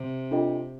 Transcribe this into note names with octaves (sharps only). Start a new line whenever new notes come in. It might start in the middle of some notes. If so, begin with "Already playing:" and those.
Already playing: C3
D4 F4 A4 D#5 G5